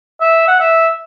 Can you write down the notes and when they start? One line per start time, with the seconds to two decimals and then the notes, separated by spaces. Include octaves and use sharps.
0.21 E5
0.48 F#5
0.60 E5